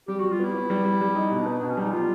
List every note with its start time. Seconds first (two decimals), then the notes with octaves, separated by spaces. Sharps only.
0.08 G3 G4
0.20 G3 F#4
0.31 F4
0.39 B3 E4
0.55 B3
0.70 G3
0.85 G3
1.01 G3
1.15 D#4
1.31 B2
1.40 D4
1.46 B3 D#4
1.58 B2 D4
1.69 C#4
1.77 G3 D#4
1.92 G3 F4